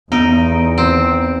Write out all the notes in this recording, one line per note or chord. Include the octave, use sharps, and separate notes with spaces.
E2 B3 D#4 D7
C4